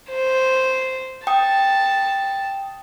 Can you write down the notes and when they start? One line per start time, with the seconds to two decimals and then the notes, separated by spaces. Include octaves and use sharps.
0.10 C5
1.27 G5 A5 D#6